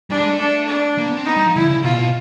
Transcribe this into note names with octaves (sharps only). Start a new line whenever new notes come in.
G3 D4
G#3
A3
D4
D4
A#3
B3
C4
B3 D#4
G3
F3
D3 E4
C#3
B2 F4
A#2
B2